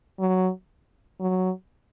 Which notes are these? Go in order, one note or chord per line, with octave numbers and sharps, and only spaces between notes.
F#3
F#3